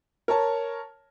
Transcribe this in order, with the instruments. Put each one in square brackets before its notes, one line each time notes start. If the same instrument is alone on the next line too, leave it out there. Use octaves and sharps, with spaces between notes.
[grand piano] A#4 C#5 A5